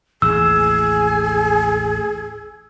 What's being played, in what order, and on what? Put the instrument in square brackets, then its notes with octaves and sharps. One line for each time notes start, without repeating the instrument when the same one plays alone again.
[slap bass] A1 D#2 [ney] G#4 [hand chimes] E6